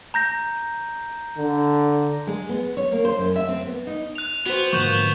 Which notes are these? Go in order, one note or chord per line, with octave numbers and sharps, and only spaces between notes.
A#5 G6 A#6
D3
G#3
B3
C#5
A#3
C5
F#2
E5
C4
B3
D#4
F#6 F7
B3 F#4 C5
G#2 D3 F3 A#3 C#6 G6 E7